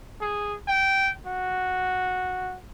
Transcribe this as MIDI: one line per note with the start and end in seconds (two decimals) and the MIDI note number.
0.21 0.54 68
0.68 1.12 79
1.26 2.57 66